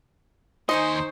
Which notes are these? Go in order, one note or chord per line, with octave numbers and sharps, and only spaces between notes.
D#2 D#4 C5 D#5 G#5 C6 C#6